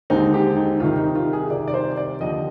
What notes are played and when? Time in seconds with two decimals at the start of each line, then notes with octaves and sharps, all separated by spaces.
0.10 D#2 D3 G#3 C4 D#4
0.34 G4
0.56 D#4
0.80 C2 C3 D#3 F4
0.98 D#4
1.15 F4
1.33 G#4
1.50 C2 C3 D#3 D5
1.68 D5
1.74 C5
1.97 D5
2.21 D#2 D3 F3 D#5